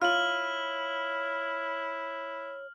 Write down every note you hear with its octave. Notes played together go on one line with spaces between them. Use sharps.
E4 F4 C#5 F6 F#7